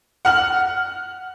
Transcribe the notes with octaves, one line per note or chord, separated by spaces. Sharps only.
F#5 F6 F#7